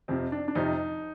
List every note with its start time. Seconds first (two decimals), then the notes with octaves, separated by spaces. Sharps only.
0.08 F2 C3 F3 C4
0.32 D4
0.48 D4
0.55 F2 C3 F3 D#4